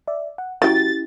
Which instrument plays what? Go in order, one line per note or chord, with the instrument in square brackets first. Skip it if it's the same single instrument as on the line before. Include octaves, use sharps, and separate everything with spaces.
[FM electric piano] D5 E5
F#5
[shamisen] F#3 G5 [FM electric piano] C#4 E4 G4 [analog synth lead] A6